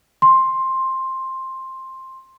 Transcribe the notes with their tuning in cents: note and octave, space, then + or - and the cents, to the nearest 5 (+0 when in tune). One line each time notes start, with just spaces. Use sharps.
C6 +10